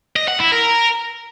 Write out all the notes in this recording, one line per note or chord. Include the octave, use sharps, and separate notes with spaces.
D#5
F#5
E4
A#4